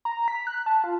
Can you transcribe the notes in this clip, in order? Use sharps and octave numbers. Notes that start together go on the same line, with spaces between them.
A#5
B6
F#6
A5
F4